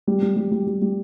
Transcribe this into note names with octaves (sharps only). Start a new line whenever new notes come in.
G3
G3
G3
G3
G3
G3